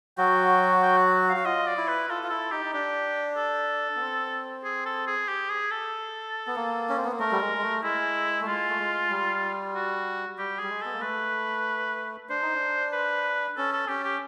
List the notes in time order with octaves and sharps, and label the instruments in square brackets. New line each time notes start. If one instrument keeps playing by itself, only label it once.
[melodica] F#3 F#4 [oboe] G5
[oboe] G5
F#5
F#5
F5
[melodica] F#4
[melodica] F4 [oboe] D#5
[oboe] D5
[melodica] E4
[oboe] B4
[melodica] F4 [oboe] A4
[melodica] F4
[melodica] E4 [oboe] A4
[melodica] D#4 [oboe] G4
[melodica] D#4
[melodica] D4 [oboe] G4
[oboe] A4
[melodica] B3
C4
[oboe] G#4
A4
G#4
G4
G#4
A4
[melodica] B3
A#3
C#4
C4
B3
A#3
[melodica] A3 [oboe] A#4
[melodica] G3
G#3
G#3
A3
[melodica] G#3 [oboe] E4
[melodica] A3
[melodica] G#3 [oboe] F4
[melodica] A3
G#3
G3
[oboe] F#4
[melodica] G3 [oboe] G4
[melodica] G3 [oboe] G#4
[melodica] G#3
[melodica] B3 [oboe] A4
[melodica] A#3
[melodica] A3 [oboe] B4
[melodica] D4 [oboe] C5
[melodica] D#4
D4
[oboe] B4
[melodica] C#4 [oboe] A4
[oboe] A4
[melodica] C#4 [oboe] G4
[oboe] G4